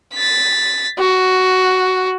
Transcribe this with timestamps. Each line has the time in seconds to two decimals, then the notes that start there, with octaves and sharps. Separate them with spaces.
0.14 A6 B6
0.99 F#4